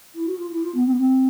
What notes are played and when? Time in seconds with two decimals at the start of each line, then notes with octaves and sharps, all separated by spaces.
0.15 E4
0.27 F#4
0.38 F4
0.51 E4
0.63 F4
0.75 B3
0.86 C4
0.93 B3
0.98 C4